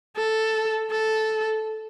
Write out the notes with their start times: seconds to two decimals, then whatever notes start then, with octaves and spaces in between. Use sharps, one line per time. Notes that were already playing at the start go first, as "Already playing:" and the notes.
0.16 A4
0.91 A4